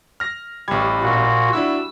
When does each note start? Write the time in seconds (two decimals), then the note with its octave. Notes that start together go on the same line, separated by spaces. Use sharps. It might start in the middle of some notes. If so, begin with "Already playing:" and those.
0.20 F6 A#6
0.68 A1 G3 C#6 G#6
1.03 A#2 F#4
1.53 D4 E4 F#4 E6